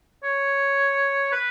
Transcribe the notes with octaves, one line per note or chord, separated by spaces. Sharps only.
C#5
B4